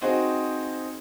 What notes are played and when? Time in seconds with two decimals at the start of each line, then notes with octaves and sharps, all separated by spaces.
0.01 C4 D#4 F#4 G#4 C5